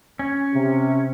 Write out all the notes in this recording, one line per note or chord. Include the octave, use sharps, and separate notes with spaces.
C#4
C3